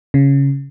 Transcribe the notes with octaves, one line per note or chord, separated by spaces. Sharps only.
C#3